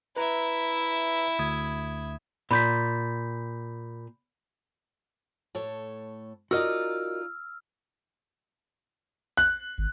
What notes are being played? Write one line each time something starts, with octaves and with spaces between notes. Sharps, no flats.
E4 B4 E5 A#5
D2 D#6 G#6
A#2 B5 G6 B6
A2 A4 C#5
D#4 F4 F#4 A#4 D5 D#5 E6 F6
F#6
G#1